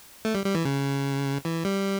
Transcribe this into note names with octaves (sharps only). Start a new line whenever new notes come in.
A3
G3
G3
E3
C#3
E3
G3